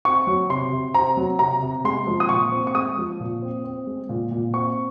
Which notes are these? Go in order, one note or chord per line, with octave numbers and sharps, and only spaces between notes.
C4 C#6
F#3
C3 C6
C3
C4 A#5
F#3
C3 A#5
C3
G#3 C6
F3
D#6
A#2 C#6
C4
C#6
G#3 D#6
F3
A#2
C4
C4
G#3
A#2
A#2
C4 C#6